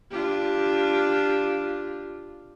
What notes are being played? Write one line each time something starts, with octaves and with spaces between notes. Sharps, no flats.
D4 F4 G4